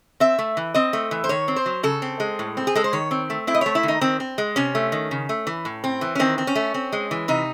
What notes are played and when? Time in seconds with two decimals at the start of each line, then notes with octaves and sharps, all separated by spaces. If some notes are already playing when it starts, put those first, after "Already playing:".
0.20 C4 E5
0.39 A3
0.57 E3
0.74 C4 D#5
0.93 A3
1.11 E3
1.24 C5
1.29 D#3 C#5
1.48 C4
1.56 C5
1.66 F#3
1.83 C#3 A4
2.02 C4
2.20 G#3
2.39 A2
2.57 C4
2.67 G#4
2.75 G#3 A4
2.84 C5
2.93 D#3 C#5
3.11 C4
3.30 A3
3.47 C4 E4
3.54 D#5
3.61 A3 C#5
3.75 E4
3.83 D#3
3.88 D#4
4.01 D#3 C4
4.20 C4
4.38 G#3
4.56 C3 C#4
4.75 A3
4.92 D#3
5.11 C#3
5.29 A3
5.47 E3
5.65 A2
5.84 C4
6.01 E3
6.15 C#4
6.19 D#3 C4
6.38 C4
6.47 C#4
6.55 A3
6.74 C4
6.92 G#3
7.11 E3
7.28 C3 D#4